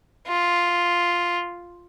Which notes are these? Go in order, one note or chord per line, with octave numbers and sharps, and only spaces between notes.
F4